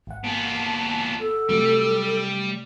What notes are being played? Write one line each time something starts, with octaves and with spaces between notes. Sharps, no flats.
G#1 F#5
A#2 B3 A5
A4
C3 F#3 G3 A3